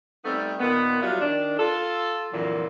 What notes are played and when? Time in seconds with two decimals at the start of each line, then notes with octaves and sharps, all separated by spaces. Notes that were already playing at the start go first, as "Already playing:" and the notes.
0.25 G3 A3 B3 C4 D#4
0.60 A#2 D#3 B3
1.02 F#3 G3 E4 F4
1.21 D#3 D4
1.59 F4 A4
2.33 F2 A#2 D3 E3 F#3